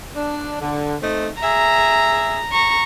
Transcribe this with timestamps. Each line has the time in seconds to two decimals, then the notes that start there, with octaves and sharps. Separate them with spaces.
0.16 D4
0.61 D3
1.01 A3 C4 D#4
1.43 G#4 E5 A#5
2.52 A#5 C#6